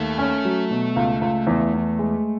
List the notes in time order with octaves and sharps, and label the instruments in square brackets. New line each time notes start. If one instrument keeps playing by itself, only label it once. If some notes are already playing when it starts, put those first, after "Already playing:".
Already playing: [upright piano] D#2 [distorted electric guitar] A3
[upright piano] C#4
F#3
B2
C#2
C#2
E2
E2
G#3